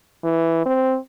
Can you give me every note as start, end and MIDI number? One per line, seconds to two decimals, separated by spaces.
0.24 0.65 52
0.66 0.98 60